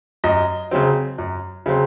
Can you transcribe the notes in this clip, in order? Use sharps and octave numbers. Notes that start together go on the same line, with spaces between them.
F#2 D#5
C#3 F#3 C4
F#2
C#3 F#3 C4